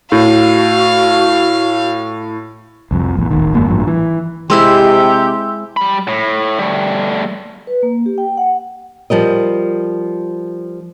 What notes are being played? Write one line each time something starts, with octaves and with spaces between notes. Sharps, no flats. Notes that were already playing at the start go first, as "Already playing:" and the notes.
A2 F#4 F5
C2 F2
A1 E2
D#1 A1 D#3
F#1 G#2 A#3
A1 G2 F3
E3
C3 G#3 C4 E4 G4 C6 E6
G3 B5
A2
G3 A3
B4
A#3
G4
G5
F#5
F3 G3 A#4 D#5